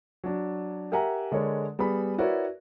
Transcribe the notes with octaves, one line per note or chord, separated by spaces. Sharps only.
F#3 D4
G4 A#4 E5 F#5 G#5 A#5
D3 G#3 A#4 C#5 D5
G3 B3 G#4 B5
E4 F#4 A#4 B4 C#5 D5